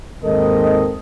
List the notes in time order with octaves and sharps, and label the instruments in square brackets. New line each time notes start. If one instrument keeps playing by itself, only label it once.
[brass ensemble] D#2 G#2 C4 A4 A#4 D#5